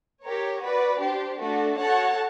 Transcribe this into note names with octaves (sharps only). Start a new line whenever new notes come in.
G4 A#4 C#5
F#4 B4 D5
D4 G4 C5
A3 D4 F#4 A4
F#4 A4 C#5 F#5 A5